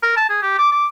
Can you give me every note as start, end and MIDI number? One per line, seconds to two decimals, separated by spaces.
0.03 0.14 70
0.17 0.25 81
0.29 0.38 68
0.42 0.54 67
0.58 0.69 86
0.72 0.86 86